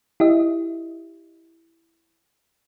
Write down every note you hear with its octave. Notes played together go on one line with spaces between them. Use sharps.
E4 G4 D#5 E5